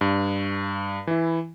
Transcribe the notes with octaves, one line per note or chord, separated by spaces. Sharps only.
G2
E3 E4